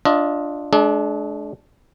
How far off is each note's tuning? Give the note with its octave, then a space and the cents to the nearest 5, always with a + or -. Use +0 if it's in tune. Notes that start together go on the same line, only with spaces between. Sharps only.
D4 +0 F4 +0 D#5 +25
G#3 +45 D4 +0 G#4 +45